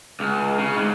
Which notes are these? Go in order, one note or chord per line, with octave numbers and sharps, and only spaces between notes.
C#2
C#3
G#2